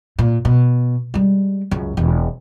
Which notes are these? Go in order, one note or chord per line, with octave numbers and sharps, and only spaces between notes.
A#2
B2
G3 G#3
C#2 F#2
E1 E3